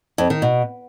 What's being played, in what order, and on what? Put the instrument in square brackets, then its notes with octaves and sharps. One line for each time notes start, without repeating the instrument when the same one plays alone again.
[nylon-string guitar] F2
D#3
B2